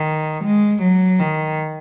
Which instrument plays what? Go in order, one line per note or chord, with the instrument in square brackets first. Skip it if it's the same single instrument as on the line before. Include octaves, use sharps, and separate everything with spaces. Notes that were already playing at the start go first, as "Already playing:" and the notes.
Already playing: [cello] D#3
G#3
F#3
D#3